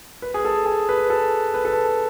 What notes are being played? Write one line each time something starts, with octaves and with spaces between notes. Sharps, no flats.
B4
G#4
A4
G#4
B4
A4
B4
A4
B4